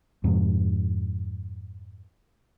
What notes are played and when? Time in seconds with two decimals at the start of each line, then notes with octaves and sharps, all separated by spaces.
0.24 F2 G#2 C3